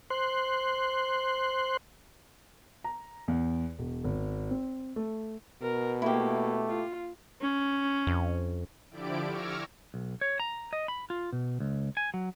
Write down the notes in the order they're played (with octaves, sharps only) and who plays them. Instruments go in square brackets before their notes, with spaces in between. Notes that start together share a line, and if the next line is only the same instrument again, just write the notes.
[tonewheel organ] C5 C6 F#6
[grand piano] A#5
E2
E1
G#1
C4
A3
[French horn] B2 [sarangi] A#4
[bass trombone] A3 [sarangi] A#3 [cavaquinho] E4 G4
[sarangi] F4
[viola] C#4
[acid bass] F2
[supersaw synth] D3 F3 E4 G4 D5 D7
C#6 D6 E6 F6 G#6 A#6
[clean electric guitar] B1
C#5
A#5
D#5
B5
F4
B2
C#2
G#5
F#3